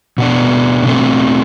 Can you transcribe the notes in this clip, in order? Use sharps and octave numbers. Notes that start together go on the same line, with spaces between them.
B2 B3 D4
B2 A3 C4